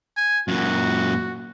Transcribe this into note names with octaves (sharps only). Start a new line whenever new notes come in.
G#5
F#2 A#2 F#4